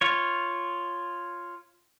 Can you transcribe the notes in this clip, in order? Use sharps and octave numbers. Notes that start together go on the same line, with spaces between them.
F4 C#5